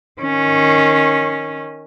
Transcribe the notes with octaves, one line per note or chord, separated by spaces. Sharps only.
D#3 C#4